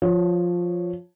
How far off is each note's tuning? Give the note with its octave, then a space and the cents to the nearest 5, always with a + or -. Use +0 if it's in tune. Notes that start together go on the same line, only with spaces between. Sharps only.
F3 +10 C#5 +0